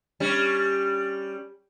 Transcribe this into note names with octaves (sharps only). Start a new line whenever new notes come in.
G3 C#4